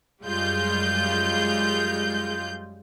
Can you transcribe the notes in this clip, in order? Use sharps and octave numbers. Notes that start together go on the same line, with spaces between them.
F#2 G3 G#3 F4 G6